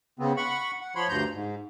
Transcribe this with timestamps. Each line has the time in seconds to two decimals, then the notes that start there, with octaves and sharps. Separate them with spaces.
0.19 C#3 B3 C4
0.37 F#5 B5 C#6
0.81 F#5
0.95 F3 C#5 B5 C6
1.09 D2 G2 A#5 C6 G6
1.33 G#2